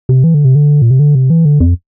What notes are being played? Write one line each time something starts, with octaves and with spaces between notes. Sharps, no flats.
C3
E3
D3
C3
D3
A#2
C3
D3
C3
E3
D3
F2